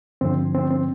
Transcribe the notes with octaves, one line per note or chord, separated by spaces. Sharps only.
G2 D3 F3 C4
C4
C4